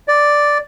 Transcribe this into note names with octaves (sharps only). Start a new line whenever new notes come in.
D5